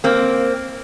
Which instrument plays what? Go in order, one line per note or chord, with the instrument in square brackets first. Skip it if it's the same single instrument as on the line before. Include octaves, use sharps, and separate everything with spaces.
[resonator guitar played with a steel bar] A#3 C4